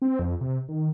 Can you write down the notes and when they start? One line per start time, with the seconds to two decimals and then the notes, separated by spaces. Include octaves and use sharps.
0.02 C4
0.19 F2
0.41 C3
0.68 D#3